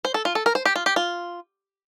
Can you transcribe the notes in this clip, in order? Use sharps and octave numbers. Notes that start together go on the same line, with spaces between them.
C5
A4
F4
A4
A#4
C5
G4
F4
G4
F4